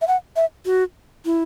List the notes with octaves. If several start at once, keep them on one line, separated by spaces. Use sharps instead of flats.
E5
F#5
E5
F#4
E4